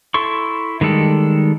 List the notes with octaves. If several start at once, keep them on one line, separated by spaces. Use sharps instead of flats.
E4 A4 C6 C#6
D#3 G3 G#3 A4